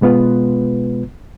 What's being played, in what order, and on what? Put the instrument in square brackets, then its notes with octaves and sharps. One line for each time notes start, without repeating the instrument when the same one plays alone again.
[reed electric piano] B2 G#3 B3 F4 B4